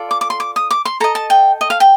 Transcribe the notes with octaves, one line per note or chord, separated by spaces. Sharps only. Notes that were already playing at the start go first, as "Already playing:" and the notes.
Already playing: F4 A4 D5
D6
D6
C6
D6
D#6
D6
C6
A4 D#5 A#5
A5
G5
D#5
F5
G5